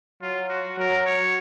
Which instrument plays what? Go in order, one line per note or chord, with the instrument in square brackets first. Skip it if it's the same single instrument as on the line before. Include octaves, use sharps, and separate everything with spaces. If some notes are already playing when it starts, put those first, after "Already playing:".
[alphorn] F#3 [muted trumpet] F4
[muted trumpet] F#4
[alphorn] F#3 [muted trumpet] A#4
[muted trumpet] C#5